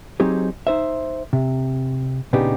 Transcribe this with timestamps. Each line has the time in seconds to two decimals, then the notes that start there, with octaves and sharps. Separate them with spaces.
0.20 F#3 C4 D#4 G4 G#4
0.67 D#4 C5 E5
1.33 C3
2.33 A#2 C#3 B3 D4 D#4 G4